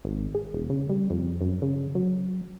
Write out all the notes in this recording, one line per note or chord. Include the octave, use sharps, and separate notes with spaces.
G#1
G#4
E1
C#3
G3
F2
F#2
C#3
F#3